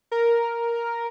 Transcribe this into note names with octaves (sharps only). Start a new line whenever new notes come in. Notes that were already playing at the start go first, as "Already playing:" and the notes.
A#4